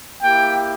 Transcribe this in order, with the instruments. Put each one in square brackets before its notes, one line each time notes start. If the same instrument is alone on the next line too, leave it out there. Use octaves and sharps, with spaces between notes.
[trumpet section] A#3 E4 G4 G5